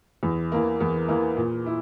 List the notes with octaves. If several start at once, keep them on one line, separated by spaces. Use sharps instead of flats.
E2
E3 A#3
E2
E3 A#3
A#2
E4